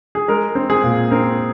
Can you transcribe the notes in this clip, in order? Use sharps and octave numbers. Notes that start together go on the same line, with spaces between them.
G#4
G#3 A#4
C4
G#4
A#2
C4 A#4